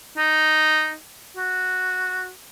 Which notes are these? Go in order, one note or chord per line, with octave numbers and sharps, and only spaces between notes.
D#4
F#4